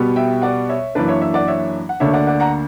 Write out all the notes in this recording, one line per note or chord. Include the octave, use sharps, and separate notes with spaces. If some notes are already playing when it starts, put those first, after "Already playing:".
Already playing: B2 G3 B3
E5 G5
D5 F#5
C#5 E5
F#2 E3 A#3 D4 B4 D5
C#5 E5
C#5 E5
D5 F#5
C#5 E5
F#5
D2 D3 A#3 D4 C#5 E5
D5 F#5
D5 F#5
F#5 A#5